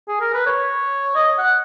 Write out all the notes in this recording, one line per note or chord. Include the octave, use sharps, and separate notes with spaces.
G#4
A#4
B4
C#5
D#5
F#5